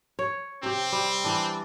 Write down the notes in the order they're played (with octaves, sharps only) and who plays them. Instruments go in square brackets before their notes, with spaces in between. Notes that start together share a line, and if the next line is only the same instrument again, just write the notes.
[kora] C#5
[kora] C3 G4 [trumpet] C4
[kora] G3
E3 D4